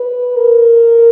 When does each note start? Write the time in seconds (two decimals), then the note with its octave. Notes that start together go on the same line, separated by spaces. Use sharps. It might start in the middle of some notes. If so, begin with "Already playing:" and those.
Already playing: B4
0.36 A#4